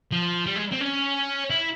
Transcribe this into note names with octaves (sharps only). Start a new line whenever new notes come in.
F3
G3
G#3
C4
C#4
E4